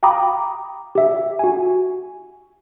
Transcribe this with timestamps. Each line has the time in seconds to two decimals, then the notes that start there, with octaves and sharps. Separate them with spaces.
0.03 F5 G5 A#5 B5 D6 D#6
0.95 G4 E5
1.39 F#4 G#5